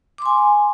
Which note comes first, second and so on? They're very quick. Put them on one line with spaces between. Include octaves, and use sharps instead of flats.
D6 C6 G#5